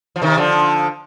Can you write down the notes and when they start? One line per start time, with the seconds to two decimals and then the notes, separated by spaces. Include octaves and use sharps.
0.16 F3
0.22 C3 D#3
0.38 D3 F3